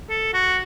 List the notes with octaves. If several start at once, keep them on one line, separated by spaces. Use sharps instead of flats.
A4
F#4